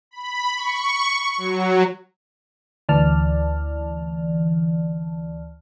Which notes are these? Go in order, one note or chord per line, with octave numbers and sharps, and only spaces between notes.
B5
C#6
F#3
D2 E3 D5 A5 F6